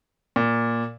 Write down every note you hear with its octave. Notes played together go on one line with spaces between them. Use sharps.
A#2